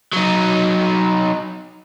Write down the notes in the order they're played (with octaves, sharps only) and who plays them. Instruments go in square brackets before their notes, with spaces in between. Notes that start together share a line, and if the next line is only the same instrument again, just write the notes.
[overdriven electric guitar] F#3 D#4